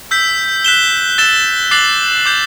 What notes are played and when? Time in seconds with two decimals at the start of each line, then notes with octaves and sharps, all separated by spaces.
0.11 E6 G6 B6
0.64 F#6 B6 E7 G7
1.18 E6 A6 E7 G7
1.71 D6 F#6 A6 C7 F#7
2.26 D6 G6 C7